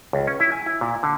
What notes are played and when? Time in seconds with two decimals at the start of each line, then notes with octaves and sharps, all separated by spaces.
0.13 C#2
0.27 C#4
0.40 E4
0.52 G#5
0.66 E4
0.81 A#2
1.03 D3